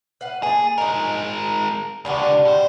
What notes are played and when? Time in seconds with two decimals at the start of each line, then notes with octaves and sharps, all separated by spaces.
0.21 B4 F5 F#5
0.43 A#3 G#4 A5
0.78 D#3 G#3 D#4 A#4
2.05 C#2 D3 G3 B3 F#4
2.45 A2 C5